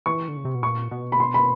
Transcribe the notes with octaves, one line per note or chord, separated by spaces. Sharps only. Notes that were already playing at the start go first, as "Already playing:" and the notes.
E3 C#6
D3
C#3
C3
B2
A#2 C#6
B2
B5
C6
B5